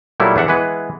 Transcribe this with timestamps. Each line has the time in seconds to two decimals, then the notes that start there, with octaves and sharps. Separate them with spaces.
0.20 A#2 F#3 G3 A3 E4
0.36 E2 D4 E5 F#5
0.48 E3 G#3 B3 B4